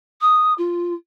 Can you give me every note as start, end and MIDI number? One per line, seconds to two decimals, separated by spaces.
0.21 0.53 87
0.58 0.93 65